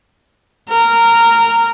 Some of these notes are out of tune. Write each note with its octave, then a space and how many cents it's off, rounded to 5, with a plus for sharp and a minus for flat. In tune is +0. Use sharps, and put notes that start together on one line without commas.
A#4 -15